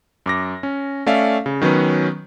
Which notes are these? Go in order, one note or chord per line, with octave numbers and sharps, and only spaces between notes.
F#2 D6 A#6
C#4
A3 C#4 D5 E5 F5
C#3
D#3 F#3 B3 C#4 B4